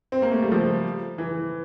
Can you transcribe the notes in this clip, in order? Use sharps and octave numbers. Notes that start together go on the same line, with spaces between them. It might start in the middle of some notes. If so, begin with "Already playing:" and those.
C4
A#3
A3
G3
F3
E3